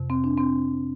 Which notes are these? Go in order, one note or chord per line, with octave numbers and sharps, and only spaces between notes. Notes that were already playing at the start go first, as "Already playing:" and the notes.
Already playing: F2 C3
C4
D4
C4